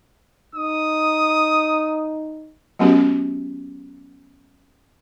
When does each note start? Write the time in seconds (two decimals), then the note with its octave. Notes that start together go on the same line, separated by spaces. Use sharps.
0.55 D#4 D#6
2.79 F#3 A3 B3 C#4 F#4 G4